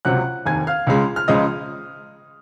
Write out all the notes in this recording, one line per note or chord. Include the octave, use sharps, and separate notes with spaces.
C#2 C3 F#3 F#5 F#6
F1 D#2 D#3 G#5 G#6
F5 F6
C#2 C#3 G#3
F6
C#2 C#3 F3 G#3 D#5 D#6